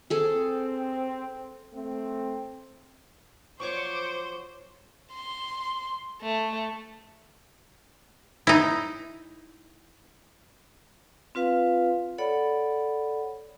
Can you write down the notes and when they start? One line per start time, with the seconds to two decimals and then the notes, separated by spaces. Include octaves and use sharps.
0.10 C4 G#4 A4
1.74 A3 C4
3.60 F3 F#3 C5 C#5 C#6 D6
5.13 C6
6.22 A3
8.47 D#4 E4
11.35 C4 F4 B4 F5
12.18 A4 C#5 D5 F#5 B5